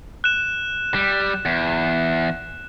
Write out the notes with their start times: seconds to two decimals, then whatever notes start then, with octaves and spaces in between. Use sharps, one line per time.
0.24 F#6 E7
0.95 G3
1.45 E2